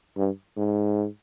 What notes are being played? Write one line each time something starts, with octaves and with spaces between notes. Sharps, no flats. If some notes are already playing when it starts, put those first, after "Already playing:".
G2
G#2